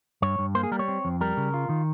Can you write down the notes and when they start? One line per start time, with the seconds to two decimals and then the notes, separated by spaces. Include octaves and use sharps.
0.22 G2 C#5
0.39 G2
0.55 A#3 C5
0.63 G#4
0.72 G3 A#4
0.79 C#5
0.88 C4
1.05 F2
1.21 G3 A#4
1.37 C#3
1.54 F4
1.69 D#3